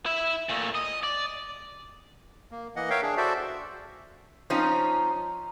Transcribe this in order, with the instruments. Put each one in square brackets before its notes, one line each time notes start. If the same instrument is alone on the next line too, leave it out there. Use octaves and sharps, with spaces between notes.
[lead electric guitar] E4 E5
A#2 A3
D#5
D5
[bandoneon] A#3
E3 A#3 D#5 F#5
A#4 C#5 E5 F5 G5
D4 G#4
F#4 A4 C5 D5 E5
[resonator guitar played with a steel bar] F3 C4 C#4 D#4 F4